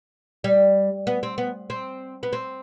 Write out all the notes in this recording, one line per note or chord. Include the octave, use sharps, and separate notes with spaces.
G3
B3
C4
B3
C4
B3
C4